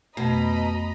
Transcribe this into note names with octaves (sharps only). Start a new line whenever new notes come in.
F2 B2 A3 D#5 A#5 B5